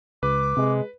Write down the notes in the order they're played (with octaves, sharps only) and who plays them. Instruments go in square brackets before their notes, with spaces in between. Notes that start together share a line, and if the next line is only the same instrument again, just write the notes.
[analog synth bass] C#2 [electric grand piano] B4 [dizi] D6
[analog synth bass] C3 [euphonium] G#3